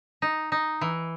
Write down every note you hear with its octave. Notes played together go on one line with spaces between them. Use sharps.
D#4
D#4
E3